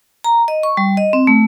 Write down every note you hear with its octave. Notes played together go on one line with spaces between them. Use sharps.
A#5
D#5
C#6
G3
D#5
C4
A3